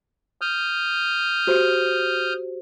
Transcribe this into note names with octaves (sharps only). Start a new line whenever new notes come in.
D#6 F6 G6
F#4 G4 C5